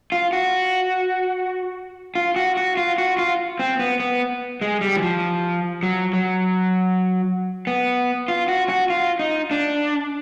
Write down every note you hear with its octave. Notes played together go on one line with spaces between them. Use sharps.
F4
F#4
F4
F#4
F#4
F4
F#4
F4
C4
B3
B3
G#3
G3
E3
F3
F#3
F#3
B3
F4
F#4
F#4
F4
D#4
D4